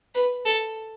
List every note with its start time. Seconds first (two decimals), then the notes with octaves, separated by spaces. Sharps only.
0.15 B4
0.46 A4